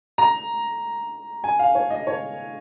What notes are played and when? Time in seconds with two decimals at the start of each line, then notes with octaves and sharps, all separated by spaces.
0.18 A#5
1.44 G#5
1.59 F5
1.75 C#5
1.90 D#5
2.07 C#5